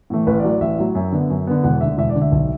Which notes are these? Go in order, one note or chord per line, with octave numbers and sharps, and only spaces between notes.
A2 E3 A3
A1 B4
D5
A2 F#3
D5
A1 E5
A2 F#3
F#2 E5
D3 B3
F#2
D3 B3
E1 F#5
D2 D3 E5
E1 E5
D5
D2 D3
E5
B1